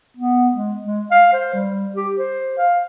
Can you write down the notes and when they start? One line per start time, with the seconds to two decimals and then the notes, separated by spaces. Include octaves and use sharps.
0.17 B3
0.54 G#3
0.84 G#3
1.11 F5
1.33 C5
1.54 G3
1.96 G4
2.18 C5
2.58 F5